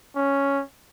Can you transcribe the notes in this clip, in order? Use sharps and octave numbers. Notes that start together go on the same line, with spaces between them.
C#4